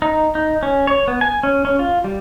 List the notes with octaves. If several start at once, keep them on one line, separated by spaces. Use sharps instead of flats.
D#4
D#4
C#4
C#5
B3
G#5
C#4
C#4
F4
G3